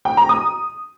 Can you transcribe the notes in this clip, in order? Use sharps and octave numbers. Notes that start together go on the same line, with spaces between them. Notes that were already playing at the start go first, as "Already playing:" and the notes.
G5
A#5
D#6